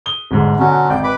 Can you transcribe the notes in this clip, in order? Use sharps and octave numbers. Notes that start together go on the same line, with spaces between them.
D#6 G7
G1 G#2 D3
B2 D3 F#3 C#4 F#4
G#1 D5 G5
B4 B5 D6